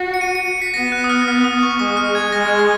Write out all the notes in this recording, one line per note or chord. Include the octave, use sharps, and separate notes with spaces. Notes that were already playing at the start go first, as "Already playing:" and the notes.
Already playing: F#4
C#7
D#7
C#7
C#7
B6
B3 A#6
F#6
D#6
F6
F6
D#6
C#6
G#3 D#6
F6
G#6
G#3 A#6
G#6
A#6